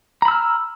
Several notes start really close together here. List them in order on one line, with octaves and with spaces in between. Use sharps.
A#5 B5 E6 F6